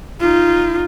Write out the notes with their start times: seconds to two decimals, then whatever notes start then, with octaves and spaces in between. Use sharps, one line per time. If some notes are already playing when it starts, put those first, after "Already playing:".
0.20 D#4 F4